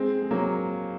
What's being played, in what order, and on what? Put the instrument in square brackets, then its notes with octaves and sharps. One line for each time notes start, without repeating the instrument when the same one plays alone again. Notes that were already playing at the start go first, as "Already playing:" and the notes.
Already playing: [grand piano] G#3 C4
G#3
F#3 A#3